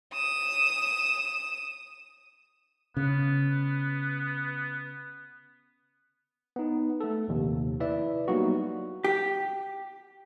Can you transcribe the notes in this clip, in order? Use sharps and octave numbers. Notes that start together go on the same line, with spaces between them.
D#6 E7
C#3 B3
B3 D#4
A3 A4
A#1 D#2 C3
E4 B4 D5 E5
F#3 G3 A#3 B3 D#4 F#4
G4